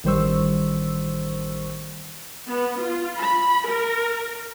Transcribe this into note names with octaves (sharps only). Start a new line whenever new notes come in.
A1 D#3 G3 C5 C#6 E6
B3
F4
B5
A#4